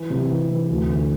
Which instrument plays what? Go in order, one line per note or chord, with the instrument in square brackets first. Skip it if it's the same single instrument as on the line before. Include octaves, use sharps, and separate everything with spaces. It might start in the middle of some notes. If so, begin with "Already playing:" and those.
Already playing: [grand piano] E3
C3
E3
E3
D2
D3